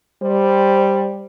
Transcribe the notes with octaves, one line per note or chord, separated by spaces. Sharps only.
G3 C5